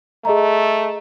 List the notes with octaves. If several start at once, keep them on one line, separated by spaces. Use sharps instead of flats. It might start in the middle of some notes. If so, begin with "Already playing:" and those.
A3 G#4 D#5 A#5